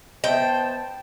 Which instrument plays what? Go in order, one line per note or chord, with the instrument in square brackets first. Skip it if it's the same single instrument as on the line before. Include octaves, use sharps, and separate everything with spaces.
[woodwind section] B3 C5 A5 [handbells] D#5 E5 [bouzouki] G5